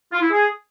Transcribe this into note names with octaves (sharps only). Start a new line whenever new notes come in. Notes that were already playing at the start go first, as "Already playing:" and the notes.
F4
E4
G#4